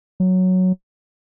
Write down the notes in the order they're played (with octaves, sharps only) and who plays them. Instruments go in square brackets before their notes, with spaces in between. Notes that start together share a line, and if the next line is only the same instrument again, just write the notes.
[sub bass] F#3